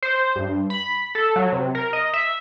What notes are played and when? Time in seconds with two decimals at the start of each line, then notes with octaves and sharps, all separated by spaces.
0.03 C5
0.36 G2
0.70 B5
1.15 A4
1.36 F#3
1.52 C3
1.75 A#4
1.93 D#5
2.14 E5